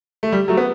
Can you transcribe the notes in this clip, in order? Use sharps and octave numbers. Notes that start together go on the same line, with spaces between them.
A3
G3
F#3 A3
B3